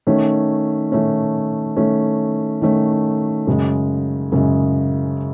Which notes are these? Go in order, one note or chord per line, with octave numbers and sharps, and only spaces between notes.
D#3 A3 C#4
D#3 A3 C#4
D#3 A3 C#4
D#3 A3 C#4
F#2 C#3 G#3
F#2 C#3 G#3